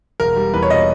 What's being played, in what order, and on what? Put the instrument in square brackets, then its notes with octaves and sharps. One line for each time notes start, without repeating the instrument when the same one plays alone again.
[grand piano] E1 A#4
G3
E2 B4
C#5
B2 D#5